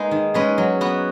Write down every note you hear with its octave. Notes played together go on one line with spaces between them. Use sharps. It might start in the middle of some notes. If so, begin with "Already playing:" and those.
Already playing: G#3 A#3 D#4 G#4 B4
D#3
G#3 C#4 G#4 B4
F#3
B3 F#4